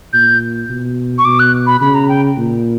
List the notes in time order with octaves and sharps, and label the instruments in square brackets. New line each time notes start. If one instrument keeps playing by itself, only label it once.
[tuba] A#2 [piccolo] G6
[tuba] B2
[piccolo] C#6
[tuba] B2 [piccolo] D6
[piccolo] F#6
B5
[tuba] C#3 [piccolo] B5
[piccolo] A#5
G5
[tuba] A#2